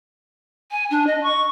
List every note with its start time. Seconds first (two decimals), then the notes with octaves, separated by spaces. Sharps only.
0.71 G#5
0.91 D4
1.07 D#5
1.23 C#6